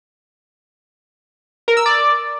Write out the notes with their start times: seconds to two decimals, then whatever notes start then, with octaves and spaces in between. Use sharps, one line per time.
1.68 A#4
1.77 E6
1.86 D5